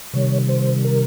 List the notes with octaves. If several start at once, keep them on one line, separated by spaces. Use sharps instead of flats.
C3 D#3 G3 C#5
C5
A#4